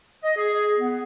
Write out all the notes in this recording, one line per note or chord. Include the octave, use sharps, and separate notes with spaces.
D#5
G#4
B3